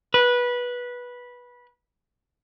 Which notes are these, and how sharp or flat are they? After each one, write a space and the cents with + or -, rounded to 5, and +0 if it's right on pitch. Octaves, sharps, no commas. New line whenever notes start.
B4 -15